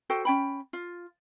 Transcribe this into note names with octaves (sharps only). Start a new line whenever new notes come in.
F#4 A4 C5 G5
C#4 G5 B5
F4